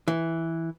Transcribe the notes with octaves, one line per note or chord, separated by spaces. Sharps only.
E3